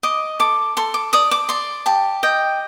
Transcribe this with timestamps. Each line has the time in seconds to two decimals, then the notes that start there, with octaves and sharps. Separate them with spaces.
0.03 D#5 D6
0.40 A4 D6
0.77 A4 C6
0.94 D6
1.13 D5 D#6
1.31 D6
1.49 D5 C6
1.86 G4 A5
2.23 D#5 G5